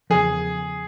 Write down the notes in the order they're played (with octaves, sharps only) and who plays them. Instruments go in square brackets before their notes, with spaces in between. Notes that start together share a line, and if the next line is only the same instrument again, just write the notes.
[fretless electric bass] E2 C#3 F3 [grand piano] G#4